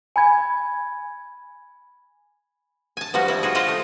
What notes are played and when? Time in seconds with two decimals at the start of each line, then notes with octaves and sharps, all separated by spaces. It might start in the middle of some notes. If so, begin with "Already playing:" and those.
0.16 G#5 B5 G#6
2.97 G#5 A5
3.14 F3 G3 B3 F#4
3.28 G3 E4
3.43 F4 F#4 G#4
3.55 F4 G4 C5 D#5 F#5 A5
3.68 A3